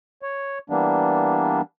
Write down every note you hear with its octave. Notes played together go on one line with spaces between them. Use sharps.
C#5
E3 G3 A#3 B3 D4